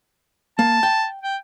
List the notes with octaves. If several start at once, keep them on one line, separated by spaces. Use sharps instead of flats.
A#3 A5
G5
G5